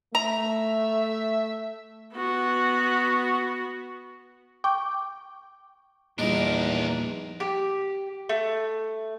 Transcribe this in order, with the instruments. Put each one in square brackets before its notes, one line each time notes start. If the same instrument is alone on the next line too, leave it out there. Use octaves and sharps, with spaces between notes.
[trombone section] A3 [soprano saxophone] E5 [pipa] A#5
[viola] B3 F#4
[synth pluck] G5 [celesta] C#6 D6
[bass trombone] E2 [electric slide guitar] A#2 D#3 F3 [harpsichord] G3 D#4 [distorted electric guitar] D4 A#4
[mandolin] G4
A3